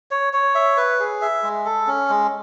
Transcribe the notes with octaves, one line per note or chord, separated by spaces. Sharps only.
C#5
C#5
E5
B4
G#4
E5
G#3
A4
C#4
G#3